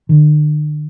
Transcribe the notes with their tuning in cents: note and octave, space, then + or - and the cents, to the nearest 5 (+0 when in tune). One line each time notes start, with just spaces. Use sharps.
D3 +45